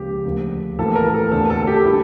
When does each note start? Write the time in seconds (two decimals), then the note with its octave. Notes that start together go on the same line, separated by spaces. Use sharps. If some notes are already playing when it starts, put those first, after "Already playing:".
Already playing: C#2 C#3 F3 A#3 G4
0.25 D2 D3 F3 A#3
0.78 A2 E3 A#3 A4
0.95 A#4
1.14 A4
1.31 E2 D3 A3 A4
1.50 A4
1.62 A4
1.67 G4
1.86 D3 G3 A#3 E4